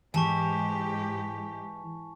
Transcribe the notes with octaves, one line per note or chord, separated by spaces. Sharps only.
G#2 E3 G#3 G4 G#5 A5 C#6